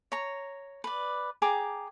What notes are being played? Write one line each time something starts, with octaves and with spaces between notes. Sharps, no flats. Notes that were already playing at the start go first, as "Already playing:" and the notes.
C#5 A#5
B4 D5
G#4 G5 A#5 D6